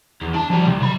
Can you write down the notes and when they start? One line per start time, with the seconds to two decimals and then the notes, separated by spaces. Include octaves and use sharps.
0.21 E2
0.34 D4 A5
0.50 F3 G3
0.67 C2
0.82 F#3 B5